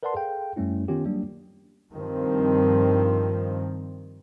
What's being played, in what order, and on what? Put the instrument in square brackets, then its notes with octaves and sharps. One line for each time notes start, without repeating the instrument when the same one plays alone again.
[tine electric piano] A#4 B4 D5 F#5 A5 C6
G#4 A4 F5 G5
F#2 G3 A3 C#4 E4
D#3 B3 C#4 F4 G4
F#3 G3 A#3 D4
[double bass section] G2 D#3 F3 C4